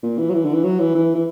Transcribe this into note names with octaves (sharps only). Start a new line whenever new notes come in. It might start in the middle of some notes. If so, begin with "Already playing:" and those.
A#2
E3
F#3
E3
D3
E3
F#3
E3
E3
E3